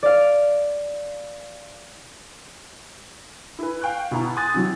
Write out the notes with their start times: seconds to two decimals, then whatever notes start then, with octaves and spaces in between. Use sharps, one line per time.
0.03 D5 F5
3.59 E4 B4
3.81 F5 G5 C#6 F#6
4.11 B2 E4 A#5
4.36 G#5 C6 D#6 F#6 G#6 A6
4.54 C3 E3 F#3